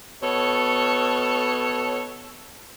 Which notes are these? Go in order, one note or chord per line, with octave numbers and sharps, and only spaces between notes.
B2 A4 C#5